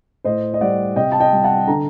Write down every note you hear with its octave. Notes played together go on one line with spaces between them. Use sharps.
A2 C5 D#5
D#5
G3 D5 F#5
C3 D#5 G5
A5
D#5 G5
G3
F#5 A5
D3 A#5